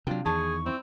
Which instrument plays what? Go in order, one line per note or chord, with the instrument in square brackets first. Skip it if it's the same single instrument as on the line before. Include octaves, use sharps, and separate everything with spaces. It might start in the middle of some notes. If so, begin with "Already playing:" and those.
[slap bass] C3 F#3 [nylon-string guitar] D4 F4 G5
[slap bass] E2 D#3 [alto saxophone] G#4 [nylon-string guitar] A5 [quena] C#6
[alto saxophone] C4 [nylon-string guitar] E4